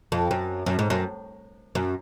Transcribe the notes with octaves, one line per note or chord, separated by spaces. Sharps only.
F2
F#2
F#2
G#2
F#2
F#2